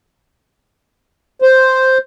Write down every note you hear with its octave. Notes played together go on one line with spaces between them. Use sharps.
C5